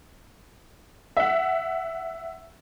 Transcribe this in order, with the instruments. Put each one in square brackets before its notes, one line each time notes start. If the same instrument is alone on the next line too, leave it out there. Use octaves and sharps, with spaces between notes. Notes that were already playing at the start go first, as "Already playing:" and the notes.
[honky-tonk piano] E5 F#5